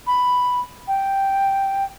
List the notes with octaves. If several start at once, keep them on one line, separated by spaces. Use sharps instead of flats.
B5
G5